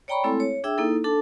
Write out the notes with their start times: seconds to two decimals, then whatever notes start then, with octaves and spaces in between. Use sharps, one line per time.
0.08 C#5 D5 G5 A#5 B5 C#6
0.24 G#3 A3 C4 E4 A4
0.40 C#5
0.64 D4 G#4 E5 G5 E6
0.78 A#3 D#4 E4 A4
1.04 D4 A4 A5